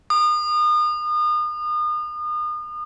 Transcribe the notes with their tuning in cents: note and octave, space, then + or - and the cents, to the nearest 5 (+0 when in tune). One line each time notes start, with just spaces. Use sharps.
D#6 -35